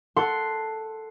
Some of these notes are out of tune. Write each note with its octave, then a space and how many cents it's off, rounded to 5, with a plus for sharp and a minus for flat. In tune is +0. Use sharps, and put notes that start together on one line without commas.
A4 +0 F#5 +0 C6 +0